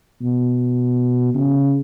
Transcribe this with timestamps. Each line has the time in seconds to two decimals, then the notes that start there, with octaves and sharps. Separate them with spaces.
0.21 B2
1.34 C#3